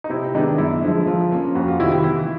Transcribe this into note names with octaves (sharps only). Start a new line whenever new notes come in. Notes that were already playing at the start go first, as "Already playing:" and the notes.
D#4
C3 E4
D#3 G#3 B3 D4 D#4
F#2 E4
D3 F3 G#3
F3 F4
A#3 C#4
F2 F#4
F4
C3 D#3 E4
E4
E3 E4